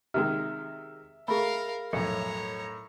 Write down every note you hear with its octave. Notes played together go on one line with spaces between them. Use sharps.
C3 D#3 G#3 E5 F6
A3 G#4 A#4 F5 B5
B1 F2 A2 C#5 A#5 C#7